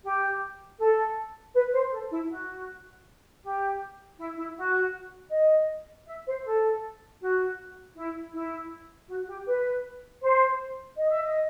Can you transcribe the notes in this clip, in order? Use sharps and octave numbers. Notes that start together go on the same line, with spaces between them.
G4
A4
B4
C5
A4
E4
F#4
G4
E4
E4
F#4
D#5
E5
C5
A4
F#4
E4
E4
F#4
G4
B4
C5
D#5
E5
D#5